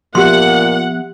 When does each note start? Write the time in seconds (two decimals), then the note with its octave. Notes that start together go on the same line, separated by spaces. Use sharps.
0.15 A#2 F3 B3 G4 E5 F#5 C6